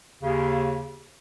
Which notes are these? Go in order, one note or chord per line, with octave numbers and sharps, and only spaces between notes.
D#2 C#3